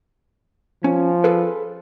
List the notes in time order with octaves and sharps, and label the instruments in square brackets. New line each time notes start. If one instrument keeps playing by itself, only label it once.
[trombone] F3 [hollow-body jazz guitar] C#4
[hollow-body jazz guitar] G#4 A4 B4